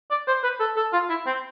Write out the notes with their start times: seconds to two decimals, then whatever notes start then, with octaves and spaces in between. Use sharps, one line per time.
0.10 D5
0.27 C5
0.43 B4
0.60 A4
0.76 A4
0.93 F4
1.10 E4
1.26 C4